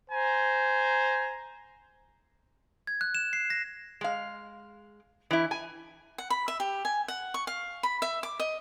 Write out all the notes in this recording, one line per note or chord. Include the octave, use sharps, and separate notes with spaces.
C5 G#5 A#5
G#6
F#6
E7
C7
A#6
G#3 F5
E3 E4
G#5
F#5
B5
E5
G4
G#5
F#5
C#6
F5
B5
E5
D6
D#5